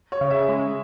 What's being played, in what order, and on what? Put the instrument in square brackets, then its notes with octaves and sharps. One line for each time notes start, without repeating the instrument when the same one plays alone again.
[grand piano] C#5
[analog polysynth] C#3
[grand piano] E5
[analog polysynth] G#3